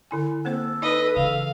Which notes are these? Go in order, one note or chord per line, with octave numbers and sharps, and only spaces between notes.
D3 E4 G#5
A#3 C4 A4 C5
D#4 B4 D#5
C#3 E3 F5